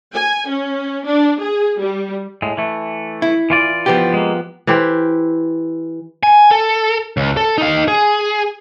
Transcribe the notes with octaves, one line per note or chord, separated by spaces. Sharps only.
G#5
C#4
D4
G#4
G3
A2 G#3
E3 A3
E4
E3 F4 D5
F3 B3 G4
G#3 A#3
E3 E4 G4 C5
G#5
A4
C#2
A4
D#4 F5
G#4